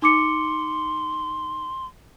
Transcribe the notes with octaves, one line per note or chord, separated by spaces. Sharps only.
D#4 C6 D6 C#7